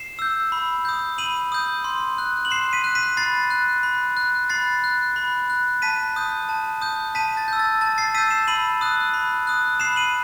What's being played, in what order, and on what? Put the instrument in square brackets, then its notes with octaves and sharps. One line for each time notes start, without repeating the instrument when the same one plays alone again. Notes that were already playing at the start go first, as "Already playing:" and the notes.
Already playing: [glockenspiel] C7 E7
E6 G6
B5
D#6 G6
B5 D#7 F#7
D#6 G6
C6
F#6
F#7
C6 C7 E7
B6 D#7
F#6
B6 D#7
B5 A6 C7
F#6
B5
F#6
B5 A6 C7
F#6
B5
F#6
A5 B6 D#7
D#6 G6
A5
D#6 G6
A5 B6 D#7
A6
E6 G6
A6
A5 A6
A6 C7
E6 G6 B6 D#7
C7 E7
B5 D#7 F#7
D#6 F#6
B5
D#6 F#6
B5 C7 E7
D#7 F#7